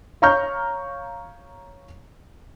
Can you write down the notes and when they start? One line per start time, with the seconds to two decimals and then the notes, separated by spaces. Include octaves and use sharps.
0.22 C#5 F5 A#5 C#6 F6 G6